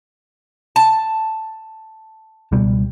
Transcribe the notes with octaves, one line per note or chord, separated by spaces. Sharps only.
A5
C#2 B2 G3